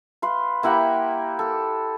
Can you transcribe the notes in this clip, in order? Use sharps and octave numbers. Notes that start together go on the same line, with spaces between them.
B4 F5 C6
A#3 E4 G4 F#5
A4